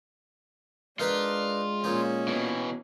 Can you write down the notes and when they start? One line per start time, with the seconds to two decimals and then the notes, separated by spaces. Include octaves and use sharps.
0.99 G#3 D4 D#4 F4 A#4 B4
1.84 A#2 C#4 D#4
2.28 B2 E3